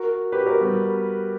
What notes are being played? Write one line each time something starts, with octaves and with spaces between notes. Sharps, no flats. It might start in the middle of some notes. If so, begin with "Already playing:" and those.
Already playing: F#4 A#4
G4 B4
F#4 A#4
G3 B3